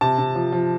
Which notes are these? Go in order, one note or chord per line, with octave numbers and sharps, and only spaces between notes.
C3 A5
C3
F3
F3